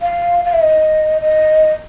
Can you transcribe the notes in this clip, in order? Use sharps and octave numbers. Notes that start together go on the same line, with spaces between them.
F5
F5
E5
D#5
D#5